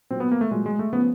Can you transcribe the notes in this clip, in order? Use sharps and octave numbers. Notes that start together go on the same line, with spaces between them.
A#2 F#3 C4
B3
A#3
A3
A#2 F#3 G#3
G#3
A3
C#3 F3 B3